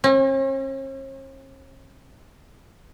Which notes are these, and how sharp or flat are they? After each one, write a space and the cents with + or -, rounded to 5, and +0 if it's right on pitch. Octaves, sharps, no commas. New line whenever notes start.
C#4 -45